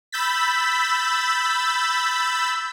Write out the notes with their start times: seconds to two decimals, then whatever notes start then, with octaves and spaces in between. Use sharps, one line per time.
0.12 B5 E6 G6 A6 B6